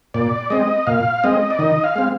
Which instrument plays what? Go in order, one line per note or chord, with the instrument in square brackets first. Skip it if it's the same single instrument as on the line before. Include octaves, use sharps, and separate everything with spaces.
[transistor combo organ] A#2 D5
G#3 C4 D#5
A#2 F5
G#3 C4 D#5
D5
D#3 D#5
F5
G#3 C4